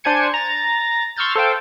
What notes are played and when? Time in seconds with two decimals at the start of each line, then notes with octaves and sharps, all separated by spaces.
0.04 D4 C5 G#5 G#6 C#7
0.34 A#5 A6
1.16 C6 C#6 E6 F6 G6 A6
1.35 A4 C5 F5 G5